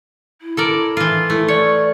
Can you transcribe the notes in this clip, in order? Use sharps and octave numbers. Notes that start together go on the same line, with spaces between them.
E4
A4 A#4 D5
E3 F4
A3 E4
C#5 D5